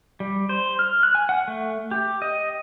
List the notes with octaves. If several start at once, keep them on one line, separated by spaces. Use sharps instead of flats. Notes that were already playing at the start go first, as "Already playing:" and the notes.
G3
C5
F6
F#6
G#5
F#5
A3
G4
D#5